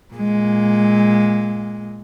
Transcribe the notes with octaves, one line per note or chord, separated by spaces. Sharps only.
A#2 G#3